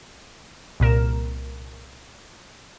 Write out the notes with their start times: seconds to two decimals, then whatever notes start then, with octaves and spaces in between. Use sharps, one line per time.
0.80 C2 A#2 A#4 E7